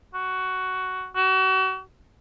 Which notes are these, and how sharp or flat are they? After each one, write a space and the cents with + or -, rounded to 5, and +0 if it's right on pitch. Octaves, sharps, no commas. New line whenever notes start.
F#4 +10
F#4 +35